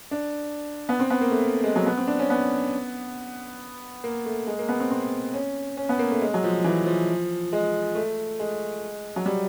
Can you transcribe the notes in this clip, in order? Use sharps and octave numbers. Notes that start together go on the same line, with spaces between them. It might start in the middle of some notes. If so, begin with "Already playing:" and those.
D4
B3
C4
B3
A#3
A3
G#3
F#3
B3
C4
D4
C#4
B3
A#3
A3
G#3
A#3
B3
C4
C4
C#4
C#4
B3
A#3
A3
G#3
F#3
F3
E3
F3
G#3
A3
G#3
F#3
G3